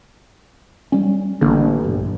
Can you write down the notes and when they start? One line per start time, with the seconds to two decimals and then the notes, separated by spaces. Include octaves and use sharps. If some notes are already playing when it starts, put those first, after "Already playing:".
0.92 G3 C#4
1.41 A1 D3 A#3 D4
1.84 B1 G2